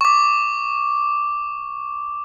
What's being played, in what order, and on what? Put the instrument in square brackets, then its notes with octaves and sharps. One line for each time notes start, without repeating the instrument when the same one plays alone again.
[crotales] C#6 D6